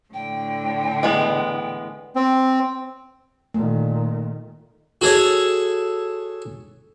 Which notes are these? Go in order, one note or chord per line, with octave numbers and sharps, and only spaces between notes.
A2 D3 G5
E3 G#3 B3
C4
A#2 D#3 A3
F#4 G#4 A4 C#5